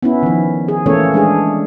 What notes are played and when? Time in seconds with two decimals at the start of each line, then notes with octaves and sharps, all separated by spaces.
0.03 B3 C#4 E4
0.23 D#3 F3
0.68 G#4
0.86 E3 A3 A#3 C#4 A4 C#5
1.14 G#3 D4 G#4